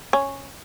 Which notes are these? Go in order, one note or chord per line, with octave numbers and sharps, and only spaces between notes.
C#4